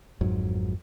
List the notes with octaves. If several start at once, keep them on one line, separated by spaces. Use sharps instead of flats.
G#1 F2 G#2 F#3